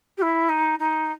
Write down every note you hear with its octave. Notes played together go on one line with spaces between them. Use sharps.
G4
E4
D#4
D#4